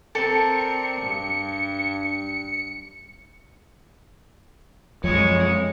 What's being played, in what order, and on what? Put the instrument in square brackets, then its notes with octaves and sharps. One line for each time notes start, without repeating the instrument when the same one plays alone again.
[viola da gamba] C4 A#4 [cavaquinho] A4 D5 A5 [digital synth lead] C#7
[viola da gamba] G2
[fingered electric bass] F#2 F3 [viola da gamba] G#3 C#5